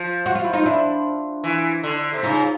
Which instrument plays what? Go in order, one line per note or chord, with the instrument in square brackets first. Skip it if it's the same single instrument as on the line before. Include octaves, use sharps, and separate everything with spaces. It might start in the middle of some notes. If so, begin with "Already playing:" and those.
Already playing: [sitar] F3
[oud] F#4
F4
E4
D#4 F4
D4 E4
[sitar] E3
D3
C3
[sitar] C#3 [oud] D#4 F4